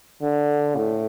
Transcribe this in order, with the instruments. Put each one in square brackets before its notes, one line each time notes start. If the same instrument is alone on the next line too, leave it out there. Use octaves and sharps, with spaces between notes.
[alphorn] D3
A2